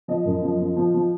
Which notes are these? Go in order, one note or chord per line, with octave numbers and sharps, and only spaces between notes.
F3 D#5
F#2
F3
F3
F3
F3